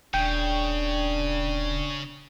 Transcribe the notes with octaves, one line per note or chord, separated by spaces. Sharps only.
D#1 C#3 D4 G5